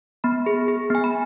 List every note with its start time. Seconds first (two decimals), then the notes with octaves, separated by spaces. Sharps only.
0.24 B3 B5
0.46 G#4
0.68 G#4
0.90 B3 G#5
1.04 B5